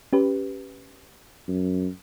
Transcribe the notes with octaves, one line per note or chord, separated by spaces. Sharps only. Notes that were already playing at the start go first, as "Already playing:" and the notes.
C#4 G4 B4
F#2